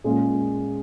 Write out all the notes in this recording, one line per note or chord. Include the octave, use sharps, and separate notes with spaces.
A#2 G#3 C#4 F4 G#4